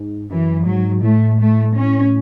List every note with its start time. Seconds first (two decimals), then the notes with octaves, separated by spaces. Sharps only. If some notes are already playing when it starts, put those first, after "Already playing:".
Already playing: G#2
0.30 F#2 E3
0.66 G#2 F#3
1.02 A2 A3
1.39 A3
1.75 C#4